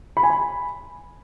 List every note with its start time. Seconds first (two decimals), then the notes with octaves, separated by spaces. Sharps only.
0.17 B5
0.23 G#5
0.30 B5